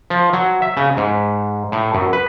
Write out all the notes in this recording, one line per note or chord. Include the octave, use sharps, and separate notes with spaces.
F3
F#3
E5
C#3
G#2
A2
F#2
B4